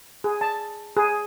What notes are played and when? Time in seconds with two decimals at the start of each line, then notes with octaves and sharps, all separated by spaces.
0.24 G#4
0.41 A5
0.97 G#4